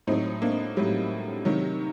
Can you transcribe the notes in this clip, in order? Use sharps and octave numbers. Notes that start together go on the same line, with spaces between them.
A2 F#3 C4 D#4
A#3 D4
A2 F#3 G3
C3 D#3 F#3